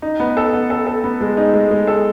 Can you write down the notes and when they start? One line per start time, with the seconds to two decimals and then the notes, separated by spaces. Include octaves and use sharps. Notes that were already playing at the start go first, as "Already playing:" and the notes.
0.02 D#4
0.20 B3
0.37 A4
0.53 B3
0.70 A4
0.87 A4
1.04 B3
1.21 G#3
1.37 D#4
1.54 G#3
1.71 G#3
1.87 A4